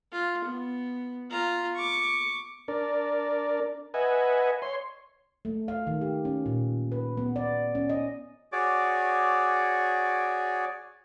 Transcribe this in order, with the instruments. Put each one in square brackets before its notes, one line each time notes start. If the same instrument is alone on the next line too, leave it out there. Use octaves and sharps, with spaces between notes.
[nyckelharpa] F4
B3
F4 A#5
C#6 D6
[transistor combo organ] D4 A#4 D5
B4 D#5 E5 F#5 G#5
C#5 C6
[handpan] A3
F5
D#3
G4
C#4
A#2
B4
B3
D5
C#4
D#5
[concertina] F#4 G#4 C#5 D5 D6